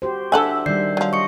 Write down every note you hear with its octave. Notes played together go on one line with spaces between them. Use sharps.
F#4 G4 C5
D4 A4 E5 F#5 G#5 E6
D#3 G3 D5 G6 C7
F3 F#3
D#5 C#6 C#7